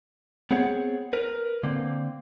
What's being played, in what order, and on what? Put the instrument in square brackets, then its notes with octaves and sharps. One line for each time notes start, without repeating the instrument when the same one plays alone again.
[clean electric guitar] B3 C4 G#4 C#5 F#5
A#4 B4
D3 A#3 C4